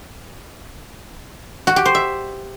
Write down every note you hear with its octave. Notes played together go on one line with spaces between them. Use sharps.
F#4
G4
C5
E5